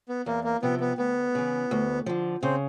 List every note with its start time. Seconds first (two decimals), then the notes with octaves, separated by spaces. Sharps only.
0.09 B3
0.26 E2 A#3
0.44 A#3
0.62 C3 F3 B3
0.80 B3
0.98 D2 B3
1.35 C#3 E3
1.71 D2
2.06 D3 F3
2.43 C#3 C4